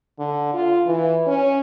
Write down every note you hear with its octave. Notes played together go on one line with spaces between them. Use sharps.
D3
F4
E3
C#4